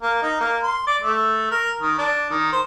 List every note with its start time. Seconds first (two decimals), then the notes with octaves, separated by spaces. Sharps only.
0.02 A#3
0.22 D#4
0.41 A#3
0.63 C6
0.87 D5
1.02 A3
1.51 A#4
1.81 D#3
1.98 D4
2.30 D#3
2.52 C5